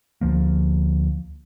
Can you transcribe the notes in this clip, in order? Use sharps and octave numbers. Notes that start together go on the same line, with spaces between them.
D2 F3 A#3